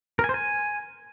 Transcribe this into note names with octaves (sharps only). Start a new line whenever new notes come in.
A#4
G#5
C5
G#5